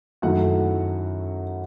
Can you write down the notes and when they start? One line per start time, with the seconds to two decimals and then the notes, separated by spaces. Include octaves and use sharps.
0.22 F#2 D#3 A3 E4 F#4 F#5